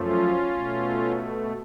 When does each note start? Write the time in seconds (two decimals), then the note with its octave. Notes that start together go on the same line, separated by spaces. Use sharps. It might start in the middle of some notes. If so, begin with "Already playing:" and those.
Already playing: F#2 F3 A3 C#4 F4
0.55 B2 A3